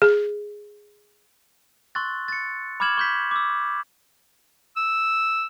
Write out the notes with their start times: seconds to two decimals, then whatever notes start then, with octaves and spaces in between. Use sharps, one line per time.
0.02 G#4
1.95 C6 C#6 E6 F#6 A6
2.28 A6 C#7
2.80 B5 D6 F6 G#6 E7 F#7
2.98 C#6 G6 B6
3.31 D6 E6
4.77 E6